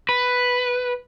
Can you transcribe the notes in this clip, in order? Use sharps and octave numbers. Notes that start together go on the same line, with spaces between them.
B4